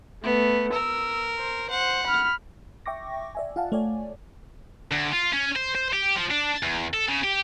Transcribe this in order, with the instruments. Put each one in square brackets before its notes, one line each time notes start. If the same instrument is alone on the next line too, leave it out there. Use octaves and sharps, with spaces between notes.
[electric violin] A3 [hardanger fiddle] B3
[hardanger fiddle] A#4 [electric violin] E6
[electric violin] C5
[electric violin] C5 [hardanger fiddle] F#5
[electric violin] B5 F6
[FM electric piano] E5 G5 C#6 D6 A#6
D5 E5 G#5
F4 F5 F#5 A5
A3 C#5 D5 G#5
[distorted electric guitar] D2
F4
C#4
C5
C5
G4
F3
D4
E2
A4
C#3
G4